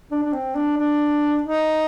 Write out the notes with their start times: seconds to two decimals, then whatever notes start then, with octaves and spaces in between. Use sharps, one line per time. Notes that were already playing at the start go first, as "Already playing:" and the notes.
0.11 D4
0.23 D4
0.33 C4
0.55 D4
0.77 D4
1.43 D#4